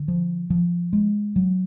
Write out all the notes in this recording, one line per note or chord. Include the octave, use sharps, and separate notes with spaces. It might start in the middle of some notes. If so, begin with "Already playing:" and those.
Already playing: D3
F3
F3
G#3
F#3